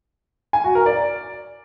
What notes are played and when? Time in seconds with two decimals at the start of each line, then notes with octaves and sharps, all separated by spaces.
0.53 G#5
0.64 F#4
0.75 A#4
0.86 D5